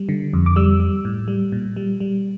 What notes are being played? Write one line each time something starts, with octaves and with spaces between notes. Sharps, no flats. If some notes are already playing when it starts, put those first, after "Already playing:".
Already playing: G3
D3
F2
D6
G3 E6
G3
A2
G3
A#2
G3
G3